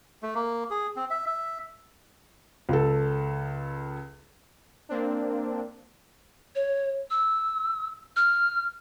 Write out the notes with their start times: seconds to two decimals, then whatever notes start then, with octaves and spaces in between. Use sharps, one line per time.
0.23 A3
0.35 A#3
0.70 G#4
0.96 C4
1.10 E5
1.27 E5
2.69 C#2 A4
4.89 A#3 C4 D4
6.55 C#5
7.11 E6
8.16 F6